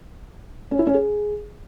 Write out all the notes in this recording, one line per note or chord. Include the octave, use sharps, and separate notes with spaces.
C#4
E4
C#4
G#4